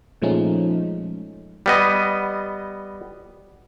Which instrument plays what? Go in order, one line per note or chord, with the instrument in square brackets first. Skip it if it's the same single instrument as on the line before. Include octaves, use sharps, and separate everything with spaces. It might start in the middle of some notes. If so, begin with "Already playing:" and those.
[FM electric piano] A#2 F3 G#3 A3 C#4 D#4
[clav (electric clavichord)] G3 B3 D#5